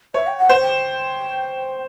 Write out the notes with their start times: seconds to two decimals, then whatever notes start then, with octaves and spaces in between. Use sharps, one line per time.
0.14 C#5 E5
0.27 G5
0.38 F#5
0.49 C5
0.61 G5